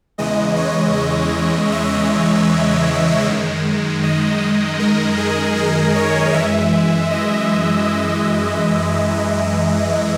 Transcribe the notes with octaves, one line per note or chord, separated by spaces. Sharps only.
E2 C#3 E3 G#3 D#5
C#5
D#5
E5
F#2 D#3 G#3
D#5
A#4
G#4
A#4
C#5
F#2 E3 G#3 E5
D#5
E5